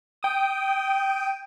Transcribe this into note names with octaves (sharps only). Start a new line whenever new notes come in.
G5 D#6